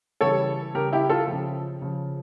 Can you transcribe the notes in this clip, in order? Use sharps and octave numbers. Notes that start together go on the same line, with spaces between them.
C#3 E3 G3 A4 C#5
C#3 G3 G4 A#4
E4 G4
F4 A4
C#3 F3
C#3 F3